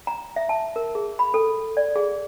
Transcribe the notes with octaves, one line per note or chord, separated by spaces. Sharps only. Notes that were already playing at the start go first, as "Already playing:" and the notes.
A#5
E5
A5
A#4
G#4
B5
A4
D5
G#4